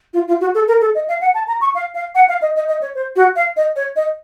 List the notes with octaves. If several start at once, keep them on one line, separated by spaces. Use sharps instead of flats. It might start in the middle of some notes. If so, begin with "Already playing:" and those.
F4
F4
F#4
A4
A#4
A4
D#5
F5
F#5
A5
A#5
C#6
F5
F5
F#5
F5
D#5
D#5
D#5
C#5
C5
F#4
F5
D#5
C#5
D#5